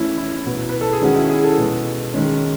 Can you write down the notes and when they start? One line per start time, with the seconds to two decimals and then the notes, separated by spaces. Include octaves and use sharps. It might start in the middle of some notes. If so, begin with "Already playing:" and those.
Already playing: E3 A3 C#4 E4
0.18 E4
0.45 B2 F#3 B3
0.69 B4
0.81 A4
0.93 G#4
1.02 D#3 G#3 C#4 F#4
1.16 E4
1.30 G#4
1.44 A4
1.57 B2 G#3 B3
2.14 D#3 G#3 C#4